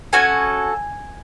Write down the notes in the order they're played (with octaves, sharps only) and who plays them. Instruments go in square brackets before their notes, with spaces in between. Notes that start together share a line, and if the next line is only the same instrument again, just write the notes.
[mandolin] C#4 F#4 A4 G#5